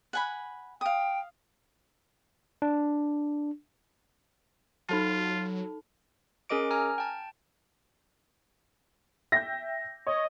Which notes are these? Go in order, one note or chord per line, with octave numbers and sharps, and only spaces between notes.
F#5 G#5 B5
F5 G5 D#6
D4
F#3 D#4 F4 A4 A5
C#4 G#4 A#4 D#5 D6 D7
G#5 A#5 F6
G5 A5
E5 G5 G6 A#6
C#5 D#5